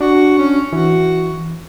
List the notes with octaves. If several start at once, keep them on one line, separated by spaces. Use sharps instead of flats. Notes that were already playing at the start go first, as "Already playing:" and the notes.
D4 F#4
C#4
E3 F#4